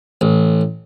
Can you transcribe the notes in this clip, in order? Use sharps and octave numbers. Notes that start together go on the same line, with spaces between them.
A1